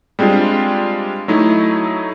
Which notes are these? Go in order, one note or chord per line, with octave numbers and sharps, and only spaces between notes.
G3 G#3 C4 D4 F4
F#3 A3 D#4 E4